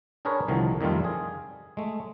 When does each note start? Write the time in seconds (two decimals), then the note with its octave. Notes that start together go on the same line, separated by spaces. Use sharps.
0.25 D4 G#4 A#4 B4 C#5
0.48 C2 D3 D#3 F3
0.81 F2 D#3 G3 A3 F4
1.04 G#4
1.77 G#3 A3